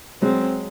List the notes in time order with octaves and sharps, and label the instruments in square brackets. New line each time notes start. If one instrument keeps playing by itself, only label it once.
[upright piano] F#3 G#3 [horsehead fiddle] C4